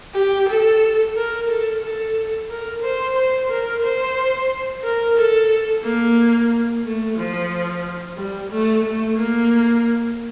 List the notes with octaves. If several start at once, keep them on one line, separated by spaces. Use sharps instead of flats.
G4
A4
A#4
A4
A4
A#4
C5
C5
A#4
C5
A#4
A4
A#3
A3
F3
G3
A3
A3
A#3